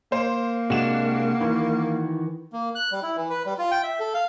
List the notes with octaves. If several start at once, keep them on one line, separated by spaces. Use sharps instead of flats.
A#3 C5
C3 G#3 D4 F#4 E7
D#3 E3
A#3
F#6
G3
E4
E3
B4
G3
F4
G5
E5
A4
F5